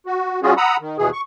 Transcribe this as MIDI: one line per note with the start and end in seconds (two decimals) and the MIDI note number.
0.06 0.40 66
0.43 0.54 55
0.43 0.54 61
0.43 0.54 65
0.43 0.54 66
0.43 0.54 68
0.57 0.76 78
0.57 0.76 82
0.57 0.76 83
0.57 0.76 87
0.57 0.76 88
0.80 0.97 51
0.98 1.10 39
0.98 1.10 47
0.98 1.10 52
0.98 1.10 68
1.13 1.21 85